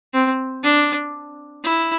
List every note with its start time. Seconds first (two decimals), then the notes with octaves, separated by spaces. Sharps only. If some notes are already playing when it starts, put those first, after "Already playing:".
0.13 C4
0.63 D4
1.63 E4